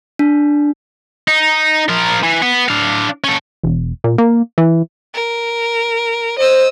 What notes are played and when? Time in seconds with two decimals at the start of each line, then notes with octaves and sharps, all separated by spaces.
0.19 D4
1.28 D#4
1.89 F3 A#4
2.23 E3
2.42 B3
2.69 D4 F5
3.24 C#4 A4
3.63 E1
4.04 A#2
4.18 A#3
4.58 E3
5.14 A#4
6.39 C5 D#5 E6